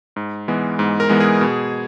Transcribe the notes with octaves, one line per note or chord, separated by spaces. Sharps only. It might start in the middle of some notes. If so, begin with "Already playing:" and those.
G#2
E3 G#3 B3
G#2
A#4
E3 G#3 B3
G#4
B2